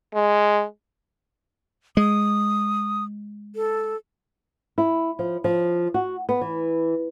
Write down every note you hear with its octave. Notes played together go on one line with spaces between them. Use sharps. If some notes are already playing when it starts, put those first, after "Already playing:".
G#3
G#3 D#6
A4
E4
F3
F3
F#4
B3
E3